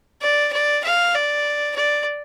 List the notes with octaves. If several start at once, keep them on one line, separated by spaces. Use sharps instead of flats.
D5
D5
F5
D5
D5